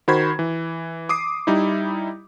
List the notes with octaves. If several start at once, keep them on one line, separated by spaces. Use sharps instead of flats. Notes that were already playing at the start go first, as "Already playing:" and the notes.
D#3 F#4 C5 B5 G#6
E3
D6 D#6 C7
G3 D#4 E4